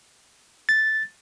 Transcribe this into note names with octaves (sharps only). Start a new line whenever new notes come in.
A6